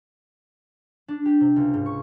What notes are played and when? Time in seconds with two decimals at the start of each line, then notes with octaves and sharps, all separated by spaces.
1.08 D4
1.25 G4
1.41 C3
1.56 C#2
1.74 G#2
1.86 C#6